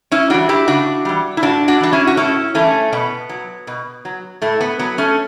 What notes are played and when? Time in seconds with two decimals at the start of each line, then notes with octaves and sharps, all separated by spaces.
0.11 C#4 E4
0.30 E3 G3 D4 F#4
0.49 E4 G4
0.68 C#3 D4 F#4
1.05 E3 G3
1.37 E4
1.42 A2 D4 F#4
1.68 D4 F#4
1.80 E3 G3 D4
1.93 C#4 E4
2.07 F#4
2.17 A2 C#4 E4
2.55 E3 G3 A3 C#4
2.92 B2 B3
3.29 F#3
3.67 B2
4.05 F#3
4.42 A2 A3
4.61 B3
4.79 F#3 B3
4.98 A3 C#4